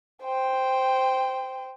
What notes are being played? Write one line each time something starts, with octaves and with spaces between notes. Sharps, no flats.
C5 G5